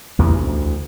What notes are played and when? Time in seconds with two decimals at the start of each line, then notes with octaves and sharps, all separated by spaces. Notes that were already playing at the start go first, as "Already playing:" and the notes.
0.19 A1 E2 C3 E3
0.35 D2